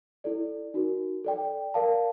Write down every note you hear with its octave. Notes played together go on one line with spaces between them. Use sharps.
E4 A4 D5
D#4 F#4 A#4
A4 D5 G5
A#4 D5 F5 A5